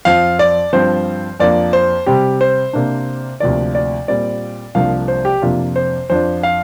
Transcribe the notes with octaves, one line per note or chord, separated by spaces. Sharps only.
F2 F3 C4 F5
D5
G2 F3 C4 C5
F2 F3 A#3 D4 D5
C5
C3 G3 C4 G4
C5
C3 A#3 D4
D2 C3 F3 A#3 D5
D5
A#2 G3 C4 D5
C2 C3 F3 A#3 D4 F5
C5
G4
F2 C3 A#3 D4 F4
C5
F2 F3 D4 C5
F5